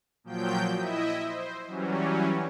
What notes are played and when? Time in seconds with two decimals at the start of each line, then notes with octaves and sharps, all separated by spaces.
0.24 A#2 F3 F#3 G5 G6
0.76 E4 D#5 E5
1.25 C5
1.66 E3 F#3 G3 C#4